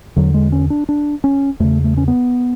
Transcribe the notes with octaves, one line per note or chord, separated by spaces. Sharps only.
E2 D3 F#3
G#3
C#4
D4
D4
C#4
E2 C#3 A3
A3
C#4
B3